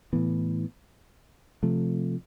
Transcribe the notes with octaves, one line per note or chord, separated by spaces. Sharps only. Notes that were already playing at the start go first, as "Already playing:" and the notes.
A2 E3 B3
C3 F3 A3